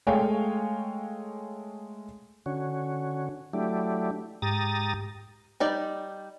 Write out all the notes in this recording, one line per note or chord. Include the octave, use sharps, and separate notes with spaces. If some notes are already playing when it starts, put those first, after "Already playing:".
G#3 A3 C#5 F5 G5 G#5
D3 C#4 F#4
F#3 A3 D4 E4 G4
G#2 G4 A#5 D#6 A6
G3 D#4 D5